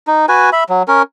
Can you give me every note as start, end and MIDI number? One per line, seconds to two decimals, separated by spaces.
0.07 0.26 63
0.29 0.50 66
0.29 0.50 71
0.29 0.50 80
0.53 0.64 76
0.53 0.64 83
0.69 0.83 54
0.88 1.02 61
0.88 1.02 70